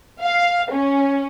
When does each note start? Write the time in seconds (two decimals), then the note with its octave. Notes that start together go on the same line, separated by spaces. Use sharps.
0.21 F5
0.72 C#4